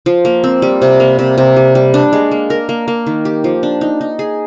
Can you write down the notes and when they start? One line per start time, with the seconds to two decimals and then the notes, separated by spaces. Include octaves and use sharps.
0.06 F3
0.25 A#3
0.44 C4
0.62 G3
0.82 C3
1.00 A#3
1.19 C3
1.38 C3
1.56 G3
1.75 G3
1.94 D4
2.13 G#3
2.31 A#3
2.50 A#4
2.69 A#3
2.88 A#3
3.07 D#3
3.25 G4
3.44 F3
3.63 D4
3.81 D#4
4.01 D#4
4.19 G#4